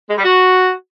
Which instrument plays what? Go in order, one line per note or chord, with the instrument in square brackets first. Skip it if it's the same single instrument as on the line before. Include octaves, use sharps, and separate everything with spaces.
[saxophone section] G#3
G3
F#4